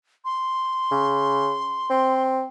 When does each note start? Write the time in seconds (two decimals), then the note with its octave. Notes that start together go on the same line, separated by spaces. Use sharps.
0.25 C6
0.91 C#3
1.90 C4